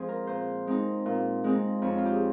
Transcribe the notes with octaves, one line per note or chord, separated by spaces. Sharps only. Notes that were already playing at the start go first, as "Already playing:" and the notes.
Already playing: F3 G#3 C4 G#4 C5
A#4
A#2 C5
G#3 C4 D#4
A#2
G#3 C4 D#4
F2 C#5
F4
G4
G#4